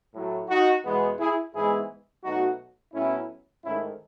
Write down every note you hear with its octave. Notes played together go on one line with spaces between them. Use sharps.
A2 F#3 A3
D#4 F#4
E2 B2 G#3 B3
E4 G#4
G#2 E3 G#3 B3 E4 G#4
B2 F#3 A3 D#4 F#4
A2 F#3 B3 C#4 E4
G#2 D#3 A3 C#4 E4